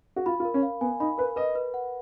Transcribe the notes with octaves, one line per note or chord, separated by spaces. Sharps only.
F#4
F4 B5
F4
A#4
C#4
F5
B3 G#5
D#4 B5
A#4 B4
B4 D#5
B4
F#5